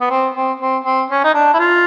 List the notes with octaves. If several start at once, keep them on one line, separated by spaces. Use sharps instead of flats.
B3
C4
C4
C4
C4
C#4
D#4
D4
E4
F4